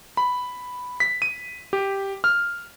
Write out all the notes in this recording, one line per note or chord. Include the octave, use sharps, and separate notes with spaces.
B5
B6
D#7
G4
F6